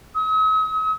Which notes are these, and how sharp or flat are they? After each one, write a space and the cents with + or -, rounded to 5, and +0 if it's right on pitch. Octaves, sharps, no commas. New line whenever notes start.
D#6 +45